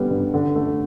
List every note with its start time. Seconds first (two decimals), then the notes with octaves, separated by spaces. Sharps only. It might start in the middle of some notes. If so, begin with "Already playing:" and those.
Already playing: D3 G3 B3
0.11 G2
0.34 D3
0.56 A3